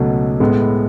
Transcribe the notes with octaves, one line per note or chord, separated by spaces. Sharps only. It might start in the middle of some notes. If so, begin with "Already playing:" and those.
Already playing: C#2 B2 F#3 A3
A2 G#3 B3